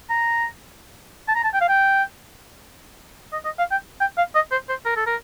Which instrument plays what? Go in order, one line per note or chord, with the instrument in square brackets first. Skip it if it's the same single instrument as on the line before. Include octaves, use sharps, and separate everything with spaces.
[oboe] A#5
A5
A#5
A5
G5
F5
G5
D#5
D#5
F5
G5
G5
F5
D#5
C5
C5
A#4
A4
A#4